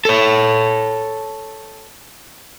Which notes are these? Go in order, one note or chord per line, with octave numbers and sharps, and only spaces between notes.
A4 C#5